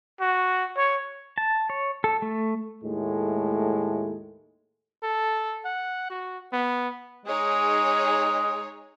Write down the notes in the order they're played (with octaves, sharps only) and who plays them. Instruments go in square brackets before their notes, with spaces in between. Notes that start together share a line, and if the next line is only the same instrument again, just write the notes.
[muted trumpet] F#4
C#5
[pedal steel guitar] A5
C#5
A4
A3
[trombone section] D#2 A2 G#3 A3
[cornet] A4
F#5
F#4
B3
[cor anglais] G#3 [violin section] D#4 G#4 C#5